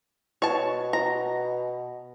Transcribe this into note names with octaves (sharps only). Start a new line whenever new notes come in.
B2 C#5 A5
A#5